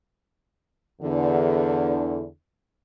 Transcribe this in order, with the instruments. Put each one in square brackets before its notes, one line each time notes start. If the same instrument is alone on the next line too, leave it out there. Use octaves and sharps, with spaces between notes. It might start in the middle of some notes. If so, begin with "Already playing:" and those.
[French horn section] E2 D3